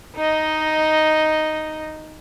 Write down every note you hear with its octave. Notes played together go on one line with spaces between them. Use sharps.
D#4 D#5